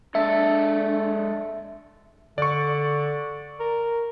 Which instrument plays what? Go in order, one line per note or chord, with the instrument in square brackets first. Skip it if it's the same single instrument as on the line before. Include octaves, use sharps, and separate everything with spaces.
[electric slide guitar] G#3 A4 [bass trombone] D4 [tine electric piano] E5
[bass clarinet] D3 [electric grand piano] D5 C#6
[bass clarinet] A#4